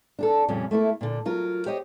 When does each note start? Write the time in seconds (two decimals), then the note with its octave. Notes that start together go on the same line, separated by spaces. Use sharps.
0.19 D4 G#4 A4
0.48 F2 A#2 C#3 G3 C#4
0.71 A3 A#3 E4 A4
1.01 A#2 D3
1.25 F#3 F4 A#4
1.66 G4 C5 C#5 D#5